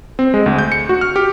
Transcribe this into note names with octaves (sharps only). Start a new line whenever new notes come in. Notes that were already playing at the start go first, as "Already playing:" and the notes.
C4
G#3
D2
G6
C#7
F#4
F6
G4